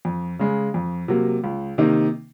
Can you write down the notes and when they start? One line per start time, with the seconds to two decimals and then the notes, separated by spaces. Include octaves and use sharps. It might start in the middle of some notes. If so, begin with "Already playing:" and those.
0.05 F2
0.39 C#3 G#3
0.74 F2
1.08 C3 F#3 A#3
1.44 C#2
1.78 C3 D#3 A#3 D#4